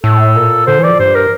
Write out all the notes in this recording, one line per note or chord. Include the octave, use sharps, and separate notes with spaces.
A2 A4
A#2
D3 C5
E3 D5
F3
G2 C5
A#4